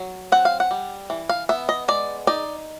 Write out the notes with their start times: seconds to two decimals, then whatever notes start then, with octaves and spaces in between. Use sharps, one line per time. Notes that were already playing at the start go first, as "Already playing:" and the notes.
Already playing: F#3
0.32 C4 F#5
0.45 F5
0.60 F#5
0.71 G3
1.10 E3
1.29 F5
1.49 B3 E5
1.69 D#5
1.88 G#3 D5
2.27 D#4 D5